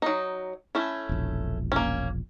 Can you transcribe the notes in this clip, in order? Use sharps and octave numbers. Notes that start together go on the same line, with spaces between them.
F#3 D#4
A3 C#4 E4
E1 A#1
A#3 C#4